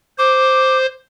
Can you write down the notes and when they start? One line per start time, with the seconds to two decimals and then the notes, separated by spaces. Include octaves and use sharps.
0.18 C5 D6